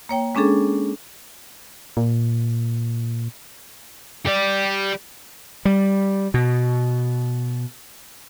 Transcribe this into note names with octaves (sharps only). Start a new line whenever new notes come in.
A#3 C#5 G5
G#3 C#4 D4 G#4 A4
A#2
G4 D5
G3
B2